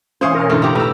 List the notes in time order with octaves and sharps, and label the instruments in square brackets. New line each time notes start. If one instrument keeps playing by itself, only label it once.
[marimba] E3 [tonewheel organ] C#4 [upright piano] E4 F5 D#6 [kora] C5 C#5
[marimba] B2 [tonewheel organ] C#4 A#4
[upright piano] A1 G2 D3 [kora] A3 F4
[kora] E4 G4 [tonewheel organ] A#5
[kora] A2 [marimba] D#4 G4 [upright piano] B4 E6